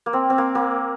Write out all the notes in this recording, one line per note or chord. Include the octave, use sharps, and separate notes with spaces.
A#3
C4
C4
A#3
A#3